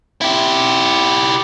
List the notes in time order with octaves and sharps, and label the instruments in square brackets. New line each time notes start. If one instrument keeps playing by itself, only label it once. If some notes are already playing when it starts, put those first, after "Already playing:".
[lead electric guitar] E4 G4